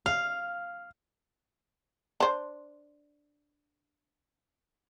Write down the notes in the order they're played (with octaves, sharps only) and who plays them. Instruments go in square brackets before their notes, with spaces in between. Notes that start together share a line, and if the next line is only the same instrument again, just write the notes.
[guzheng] F5 [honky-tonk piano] F6
[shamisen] D4 C5